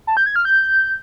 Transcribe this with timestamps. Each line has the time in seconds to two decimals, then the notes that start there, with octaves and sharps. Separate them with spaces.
0.07 A5
0.17 G6
0.26 G#6
0.36 F6
0.45 G6